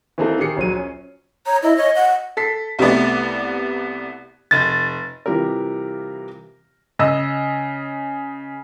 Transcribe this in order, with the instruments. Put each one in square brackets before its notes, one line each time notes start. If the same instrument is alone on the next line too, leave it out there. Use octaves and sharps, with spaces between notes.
[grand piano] E3 A#3 C4 D#4 G#4 A4
D#3 G4 G#4 C7 C#7
A#1 F#3 D#7
C#4
[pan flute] C#5 [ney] A#5
[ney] E4 [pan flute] D#5
[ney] C#5 [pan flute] D#5
[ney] F#5
[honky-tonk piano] A4 B6 C7
C2 C3 A3 B3 D5
F1 A6
[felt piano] C3 E3 G3 F4 G4 A#4
[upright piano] C#3 D#5 E6